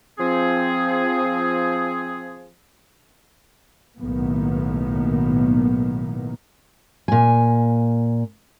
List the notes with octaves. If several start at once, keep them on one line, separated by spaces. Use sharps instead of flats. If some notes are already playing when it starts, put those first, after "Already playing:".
F3 C4 G#4
B1 A2 D#3 A#3 B3
A#2 G#5